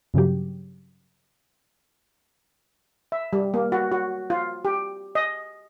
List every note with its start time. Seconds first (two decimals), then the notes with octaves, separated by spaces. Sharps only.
0.14 G2 C#3 F#3 G4
3.12 E5
3.33 G3
3.54 A#3
3.72 F#4
3.92 F#4
4.30 F4
4.65 G4
5.15 D#5